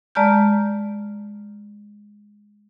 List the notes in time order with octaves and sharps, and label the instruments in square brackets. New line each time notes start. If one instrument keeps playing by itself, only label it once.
[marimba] G#3 D5 A5 A#5 F6 G6